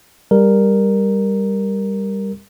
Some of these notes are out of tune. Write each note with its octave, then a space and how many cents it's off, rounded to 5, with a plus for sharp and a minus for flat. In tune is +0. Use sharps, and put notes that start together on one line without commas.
G3 +15 A#4 +0